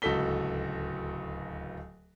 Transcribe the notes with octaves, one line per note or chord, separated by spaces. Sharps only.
D1 C#2 F#4 A4 B6 G7